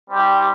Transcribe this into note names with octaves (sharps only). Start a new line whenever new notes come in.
G3 C4 D#4 G4